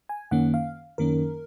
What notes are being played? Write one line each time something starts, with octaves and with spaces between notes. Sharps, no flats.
G#5
F#2 D#3 A#3 C#4 F#5
F5
F#2 D#3 A#3 C#4 A#4